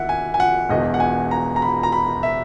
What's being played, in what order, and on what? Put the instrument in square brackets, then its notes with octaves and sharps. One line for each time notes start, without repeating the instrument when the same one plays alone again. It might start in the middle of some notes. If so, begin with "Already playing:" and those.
Already playing: [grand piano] D#2 E5 F#5
G#5
G#5
F#5
E1 E2 B2 D#5
F#5
G#5
A#5
A#5
B5
A#5
B5
E5